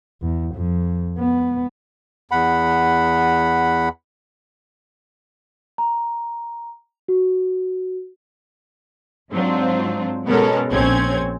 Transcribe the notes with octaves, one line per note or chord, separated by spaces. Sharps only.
E2
F2
B3
E2 F#5 B5
A#5
F#4
G#2 F#3 C4 D4 F4
B2 G#3 B3 C#4 A4 A#4
A#1 C4 C#4 G#6